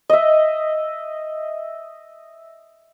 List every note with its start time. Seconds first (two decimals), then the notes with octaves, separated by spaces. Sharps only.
0.09 D#5 E5